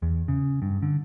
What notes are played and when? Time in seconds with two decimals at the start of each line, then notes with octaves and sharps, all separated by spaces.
0.02 E2
0.28 C#3
0.62 G2
0.83 D3